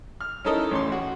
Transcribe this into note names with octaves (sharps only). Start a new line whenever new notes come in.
F6
C#4 D#4 E4 A4 A#4 D#5
A1 C#4 C#5 C6
F#4